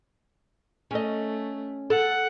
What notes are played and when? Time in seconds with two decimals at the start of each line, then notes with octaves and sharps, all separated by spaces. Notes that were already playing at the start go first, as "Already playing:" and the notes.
0.91 A3 C#4 D#5
1.90 A4 F#5